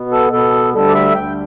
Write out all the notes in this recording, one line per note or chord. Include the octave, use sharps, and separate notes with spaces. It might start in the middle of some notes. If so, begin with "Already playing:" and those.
Already playing: B2 B3
A4
B2 B3 A4
D2 D3 G3 A4
D5
E5
D2 D3 G3 G5